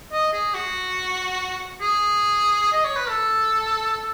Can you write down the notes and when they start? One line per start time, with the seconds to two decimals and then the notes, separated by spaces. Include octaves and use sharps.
0.12 D#5
0.33 G#4
0.54 F#4
1.81 G#4
2.72 D#5
2.85 C#5
2.96 B4
3.09 A4